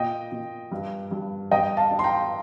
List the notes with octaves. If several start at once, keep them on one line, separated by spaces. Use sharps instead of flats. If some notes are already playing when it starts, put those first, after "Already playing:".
Already playing: A#2 D#5 G5
A#2
G2
G2
G2 D#5 G5
F5 A5
D4
C6
G5 A#5